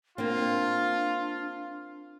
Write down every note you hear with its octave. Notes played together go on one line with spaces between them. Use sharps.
A#3 C4 D4 F4